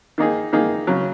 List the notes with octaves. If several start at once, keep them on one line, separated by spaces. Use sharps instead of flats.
D#3 A#3 D#4 G#4
D#3 A#3 D#4 G#4
C#3 F#3